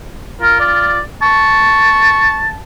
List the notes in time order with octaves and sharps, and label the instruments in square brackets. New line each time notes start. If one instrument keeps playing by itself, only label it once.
[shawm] F4 [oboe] A#4
[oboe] D5
[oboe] A5 [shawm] C#6